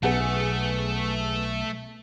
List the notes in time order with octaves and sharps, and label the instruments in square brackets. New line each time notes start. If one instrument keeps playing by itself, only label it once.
[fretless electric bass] B1 [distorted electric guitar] A3 [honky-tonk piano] B3 G#4 F#5